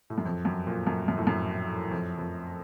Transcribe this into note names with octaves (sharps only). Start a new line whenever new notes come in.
A2
F#2
F2
F#2
A#2
F#2
F#2
A2
F#2
F2
F2